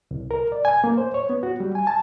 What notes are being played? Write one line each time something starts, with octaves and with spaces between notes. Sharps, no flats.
C2
A#4
D5
G#5
A#3
C5
C#5
B3
F#4
G3
G#5
A5